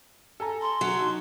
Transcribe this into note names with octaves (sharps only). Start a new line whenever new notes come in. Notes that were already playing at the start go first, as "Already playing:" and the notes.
A4 G#5 A#5
C6
F#3
D#4